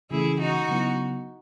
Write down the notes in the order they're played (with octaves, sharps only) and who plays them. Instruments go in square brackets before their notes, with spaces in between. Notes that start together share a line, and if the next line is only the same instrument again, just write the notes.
[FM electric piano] C#3 E3 A3 C#4 [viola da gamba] E4 G#4
[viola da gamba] D#4 F#4
[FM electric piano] C#3 F#3 B3 E4